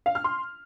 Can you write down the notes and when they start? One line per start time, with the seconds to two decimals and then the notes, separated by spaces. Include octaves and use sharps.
0.06 F5
0.15 F6
0.24 C6